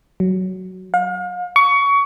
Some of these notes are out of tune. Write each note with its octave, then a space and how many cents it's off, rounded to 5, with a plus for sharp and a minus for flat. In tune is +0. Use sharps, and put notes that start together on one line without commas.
F#3 +10
F5 +40
C#6 +25